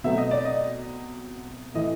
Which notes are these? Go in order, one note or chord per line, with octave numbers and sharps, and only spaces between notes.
B2 F#3 A3 C4 E5
D#5
D5
D#5
A2 E3 A3 D#5